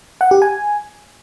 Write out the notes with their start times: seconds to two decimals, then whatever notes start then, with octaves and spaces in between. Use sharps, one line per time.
0.21 F#5
0.31 G4
0.42 G#5